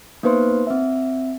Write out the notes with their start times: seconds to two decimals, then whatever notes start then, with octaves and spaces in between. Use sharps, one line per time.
0.23 A#3 B3 D#4 B4 C5 C6
0.67 C4 E5